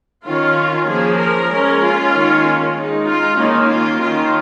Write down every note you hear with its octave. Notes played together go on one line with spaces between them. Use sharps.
D#3 C#4 F4
F3 A#3 C#4 G#4
A#4
G#3 C#4
F4
D#3 A#3 C#4
G#3 D#4
F4
D#3 A#3 C#4 D#4
F4
D#3 C#4 F4